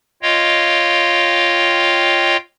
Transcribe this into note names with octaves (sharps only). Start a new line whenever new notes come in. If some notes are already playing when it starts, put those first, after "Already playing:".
F4 C#5 D#5 F5 G5